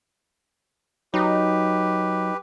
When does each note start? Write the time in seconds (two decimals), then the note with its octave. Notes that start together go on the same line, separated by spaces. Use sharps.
1.14 F#3 D#4 G4 B4